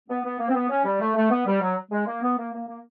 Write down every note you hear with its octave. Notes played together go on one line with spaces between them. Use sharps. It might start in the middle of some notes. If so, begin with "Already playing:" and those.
B3
B3
A#3
C4
B3
C#4
G3
A3
A3
B3
G3
F#3
G#3
A#3
B3
A#3
A#3
A#3